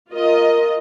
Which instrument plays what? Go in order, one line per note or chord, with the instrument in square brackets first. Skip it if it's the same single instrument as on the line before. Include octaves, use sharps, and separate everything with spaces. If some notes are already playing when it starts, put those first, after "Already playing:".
[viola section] F4 D#5 [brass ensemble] A#4